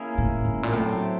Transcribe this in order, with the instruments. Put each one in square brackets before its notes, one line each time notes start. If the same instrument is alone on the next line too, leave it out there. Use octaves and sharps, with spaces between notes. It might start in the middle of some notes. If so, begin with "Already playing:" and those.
Already playing: [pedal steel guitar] A#3 C#4 E4 G#4
[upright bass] A2
A2
A#2
[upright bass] A2 [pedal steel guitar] F#3 A3 C4